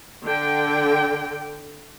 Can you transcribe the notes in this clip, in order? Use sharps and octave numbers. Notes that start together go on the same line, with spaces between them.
D3 G5